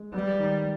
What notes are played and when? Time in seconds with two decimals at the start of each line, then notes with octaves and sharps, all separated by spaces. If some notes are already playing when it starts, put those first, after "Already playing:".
Already playing: G#3
0.14 G3 B3
0.39 D#3